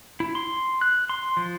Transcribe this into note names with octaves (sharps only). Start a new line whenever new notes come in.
E4
C6
F#6
C6
F3